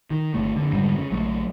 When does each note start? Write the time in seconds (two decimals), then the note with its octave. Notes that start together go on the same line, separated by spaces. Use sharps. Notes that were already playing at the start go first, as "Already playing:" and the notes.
0.11 D#3
0.34 G1 C3 A3
0.56 F2 D3
0.73 F2 G#2 D3 G3
0.96 C#3
1.11 A#1 C#3 F#3 A3